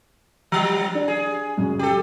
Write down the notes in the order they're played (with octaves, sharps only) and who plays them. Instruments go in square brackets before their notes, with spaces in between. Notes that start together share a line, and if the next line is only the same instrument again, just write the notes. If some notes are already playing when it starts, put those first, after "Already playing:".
[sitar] F3 G3
[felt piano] D4
[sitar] G#4
[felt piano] F#2 C#3 G#3
[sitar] G4 A4